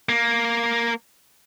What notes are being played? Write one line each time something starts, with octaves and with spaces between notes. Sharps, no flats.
A#3